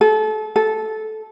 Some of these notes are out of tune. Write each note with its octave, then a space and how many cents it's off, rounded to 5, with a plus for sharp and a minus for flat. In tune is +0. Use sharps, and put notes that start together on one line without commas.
A4 -30
A4 -15